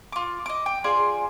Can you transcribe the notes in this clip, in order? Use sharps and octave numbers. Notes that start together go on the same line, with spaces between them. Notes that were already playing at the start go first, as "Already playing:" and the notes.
F4 D6
D#5 D6
G5
F4 G#4 C5 D5